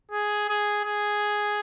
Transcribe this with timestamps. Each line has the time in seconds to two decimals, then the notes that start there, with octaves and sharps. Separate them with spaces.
0.11 G#4
0.48 G#4
0.85 G#4